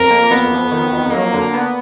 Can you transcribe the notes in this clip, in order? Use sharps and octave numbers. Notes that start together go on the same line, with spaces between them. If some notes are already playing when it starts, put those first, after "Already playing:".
Already playing: F2 A#4
A#3
F2 B3
F2
D#3
F2
F#3 A#3
D3
B3